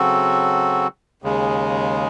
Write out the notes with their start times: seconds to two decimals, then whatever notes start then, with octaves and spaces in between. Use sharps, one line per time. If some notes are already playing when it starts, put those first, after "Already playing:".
Already playing: C#3 F#3 C4 F#4 A4
1.22 D#2 C#3 G#3